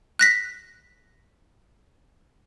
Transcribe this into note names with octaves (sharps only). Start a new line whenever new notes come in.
F#6 A#6 B6